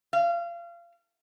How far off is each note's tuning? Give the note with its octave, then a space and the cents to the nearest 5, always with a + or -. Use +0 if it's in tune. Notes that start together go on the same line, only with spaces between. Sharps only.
F5 -30